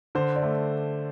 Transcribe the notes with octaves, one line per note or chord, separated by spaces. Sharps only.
D3 C5
D5
A3